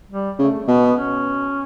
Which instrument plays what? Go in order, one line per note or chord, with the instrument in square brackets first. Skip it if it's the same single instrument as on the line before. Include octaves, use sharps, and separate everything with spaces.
[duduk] G3
[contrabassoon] C#3 [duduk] A3
[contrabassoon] B2 [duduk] B3
[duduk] B3
C#4